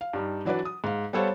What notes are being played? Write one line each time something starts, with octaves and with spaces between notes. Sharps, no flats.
F5
G2 G3 D#4
E3 F#3 D4 F#4 B4 D5
D#6
G#2 F5
G3 B3 A4 C5 C#5 F5